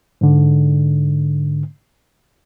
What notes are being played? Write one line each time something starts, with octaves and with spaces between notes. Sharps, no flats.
G#2 D3